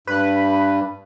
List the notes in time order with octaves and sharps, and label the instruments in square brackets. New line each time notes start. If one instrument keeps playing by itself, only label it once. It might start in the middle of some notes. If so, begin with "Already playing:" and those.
[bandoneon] G2 [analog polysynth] B4